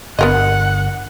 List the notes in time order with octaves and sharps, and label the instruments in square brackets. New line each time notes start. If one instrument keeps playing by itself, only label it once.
[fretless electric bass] G1 D3 [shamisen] B3 A#4 D#5 [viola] F#5